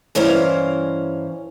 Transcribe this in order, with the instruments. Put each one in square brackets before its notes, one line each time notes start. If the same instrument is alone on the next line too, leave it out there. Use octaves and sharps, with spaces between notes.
[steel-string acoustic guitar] G2 E3 C#4 C5 F5 A#5